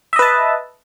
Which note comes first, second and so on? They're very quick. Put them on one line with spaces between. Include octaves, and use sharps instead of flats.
E5 D#5 B4 A5